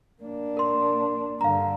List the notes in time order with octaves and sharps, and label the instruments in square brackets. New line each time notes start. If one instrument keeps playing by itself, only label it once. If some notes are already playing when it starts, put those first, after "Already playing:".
[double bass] A#3 D4
[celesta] A#4 C6
[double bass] G2 D3 [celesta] F5 A#5